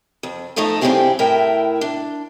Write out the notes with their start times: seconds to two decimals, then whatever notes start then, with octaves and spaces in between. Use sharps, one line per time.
0.23 F2
0.56 B2 F3 A3 D#4 A4 D#5
0.81 G2 C4 E4 F4 G4 G#4
1.19 A2 E4 A#4 E5 G5
1.81 D4